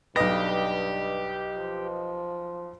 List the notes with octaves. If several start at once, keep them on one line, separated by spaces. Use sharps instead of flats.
B1 G2 G4 B4 D#5 A#6
F3